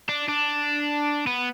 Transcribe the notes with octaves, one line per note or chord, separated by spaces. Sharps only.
D4
D4
B3